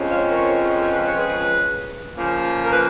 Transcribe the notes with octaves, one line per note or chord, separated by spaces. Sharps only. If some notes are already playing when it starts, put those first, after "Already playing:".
Already playing: F2 F3 G#3 C#4
C#5 F5
A#4 C#5
B4
C#5
G#4 B4
C#3 F3 A#3
A#4
B4